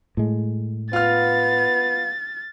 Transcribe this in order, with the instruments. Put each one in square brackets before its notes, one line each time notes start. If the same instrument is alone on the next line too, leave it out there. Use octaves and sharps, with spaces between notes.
[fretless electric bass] A2 G#3
[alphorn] B3 [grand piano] F4 F6 [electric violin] A6